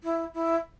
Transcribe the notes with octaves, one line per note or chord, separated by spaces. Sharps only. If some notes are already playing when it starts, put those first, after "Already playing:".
E4
E4